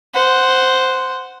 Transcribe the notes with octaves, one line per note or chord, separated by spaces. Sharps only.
C5 F#5